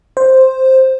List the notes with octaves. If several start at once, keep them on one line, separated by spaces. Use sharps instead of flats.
C5